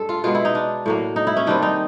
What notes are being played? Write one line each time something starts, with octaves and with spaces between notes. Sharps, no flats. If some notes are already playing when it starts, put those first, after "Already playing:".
Already playing: G2 G#3 A4
F4
B2 G#3 B3 F4
E4
D#4
D4
A2 F#3 A#3
D#4
E4
C#4
D#3 G3 C4 D4
D#4